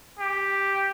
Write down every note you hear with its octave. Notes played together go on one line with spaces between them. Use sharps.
G4